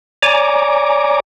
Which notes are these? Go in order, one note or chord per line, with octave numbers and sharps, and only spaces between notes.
C#5 D5 G#5 A#5 D6